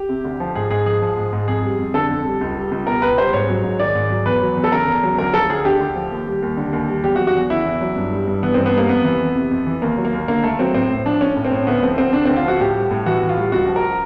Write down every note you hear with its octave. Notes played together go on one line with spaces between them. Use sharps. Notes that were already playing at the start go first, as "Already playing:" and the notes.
Already playing: G4
C3
D2
F3
G#2 G#4
G#2 G#4
F3 G#4
F3
G#2
G#2
F2 G#4
G3
F2
D3 A4
F2
G3
C#2
G3
C#2
B2 A#4
C#2 B4
G3 C5
G#2 C#5
F#3
G#2
D#3 D5
G#2
F#3
E2 B4
F#3
E2
A4
C#3 A#4
E2
F#3
D2 A#4
F3 A4
D2 G#4
D3 G4
D2
F3
D#2
G3
D#2
D3
D#2
G3
E2 G4
F#4
F#3
F#4
E2
C#3 E4
E2
F#3
G2
G3
G2
E3 B3
G2 C4
B3
G3 A#3
F2 B3
E3
F2
C3
F2
E3
D#2 A#3
F#3
A#3
D#2
D3 A#3
D#2 A3
F#3 C4
A2 C4
A2
F3 D4
F3 C#4
A2
C4
A2
D2 B3
F3 C4
D2 C4
C#3 D4
D2 C4
F4
F3 F#4
A2 G4
G3
A2
E3 F#4
A2
F4
G3
C#2 F#4
F3
A#4